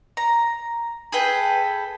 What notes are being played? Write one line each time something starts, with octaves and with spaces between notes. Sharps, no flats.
A#5
G#4 A4 B4 G5